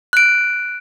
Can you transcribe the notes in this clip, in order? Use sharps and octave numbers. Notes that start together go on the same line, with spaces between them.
F#6 D7